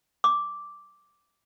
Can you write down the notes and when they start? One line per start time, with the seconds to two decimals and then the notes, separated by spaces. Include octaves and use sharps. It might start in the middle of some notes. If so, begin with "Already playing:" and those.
0.24 D6